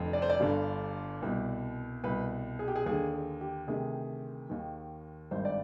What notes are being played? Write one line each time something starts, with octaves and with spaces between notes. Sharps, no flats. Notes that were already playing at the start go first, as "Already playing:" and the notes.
Already playing: F1 F2 D3
D5
C5
D5
G1 G2 D3
C2 B2
C2 B2 B4
G#4
G4
G#4
D#2 D3 G#4
G#4
G4
D2 C3 D#3 G#4
D#2 D#3
G#1 G2 D#3 C5
D5